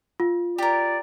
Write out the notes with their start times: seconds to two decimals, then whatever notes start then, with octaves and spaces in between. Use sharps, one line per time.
0.20 F4
0.58 G4 A#4 D5